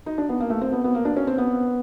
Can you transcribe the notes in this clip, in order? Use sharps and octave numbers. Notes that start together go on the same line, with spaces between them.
D#4
D4
B3
A#3
A3
C4
B3
B3
A#3
D4
C#4
C4
B3